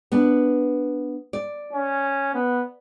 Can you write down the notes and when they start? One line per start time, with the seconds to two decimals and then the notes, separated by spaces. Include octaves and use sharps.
0.12 B3 D4
1.33 D5
1.73 C#4
2.35 B3